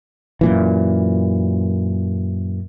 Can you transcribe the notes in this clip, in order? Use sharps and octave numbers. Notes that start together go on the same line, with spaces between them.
F#2 A#2 E3